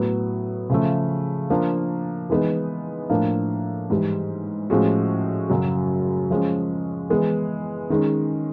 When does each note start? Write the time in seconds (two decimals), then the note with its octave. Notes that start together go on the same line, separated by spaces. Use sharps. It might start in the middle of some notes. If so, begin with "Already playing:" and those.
Already playing: A2 F#3 B3
0.70 C#3 F3 A3
1.50 F3 A#3 D4
2.30 E3 G#3 B3 D#4
3.10 A2 F3 A#3 D4
3.90 G#2 E3 G3
4.70 A2 F3 G#3 C#4 F#4
5.49 F#2 C#3 F#3
6.31 F3 G#3 C#4
7.10 E3 G#3 B3
7.90 D#3 G#3 C#4